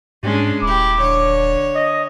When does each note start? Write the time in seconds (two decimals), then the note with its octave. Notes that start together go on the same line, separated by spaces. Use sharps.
0.23 G#2 G#3 C#4 D4
0.62 D#1 E4 G4 D6
0.98 D3 C#5
1.75 D#5